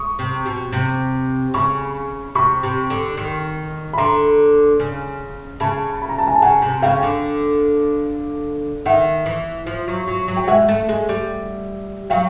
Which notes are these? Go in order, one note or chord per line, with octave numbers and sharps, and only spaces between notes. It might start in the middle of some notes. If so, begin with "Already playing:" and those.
Already playing: C#6 D#6
C3
B2
C3
C#3 B5 C#6
C3 B5 C#6
C3
D3
D#3
B5
D3 A#5 C6
C#3
C#3 A5 B5
B5
A#5
A5
G#5 A#5
A5
C#3 F#5 G#5
C3
C#3 F5 G5
D3
D#3 E5 F#5
E3
F3
F#3
F#3
F#3
G5
G#3 E5 F#5
A3
G#3
G3
F#3 F5 G5